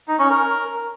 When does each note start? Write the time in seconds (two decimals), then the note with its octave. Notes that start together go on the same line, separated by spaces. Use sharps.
0.08 D#4
0.19 C#4
0.30 A#4